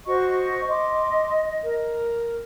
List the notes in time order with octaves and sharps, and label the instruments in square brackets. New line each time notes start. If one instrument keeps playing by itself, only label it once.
[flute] F#4 [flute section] C5 D#5 C#6
[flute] D#5 [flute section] C6 D6
[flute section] A#4